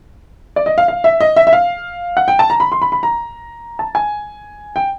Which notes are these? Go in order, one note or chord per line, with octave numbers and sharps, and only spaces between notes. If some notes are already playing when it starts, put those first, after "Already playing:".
D5
D#5
F5
F5
E5
D#5
E5
E5
F5
F#5
G5
A5
A#5
B5
C6
B5
B5
A#5
A5
G#5
G5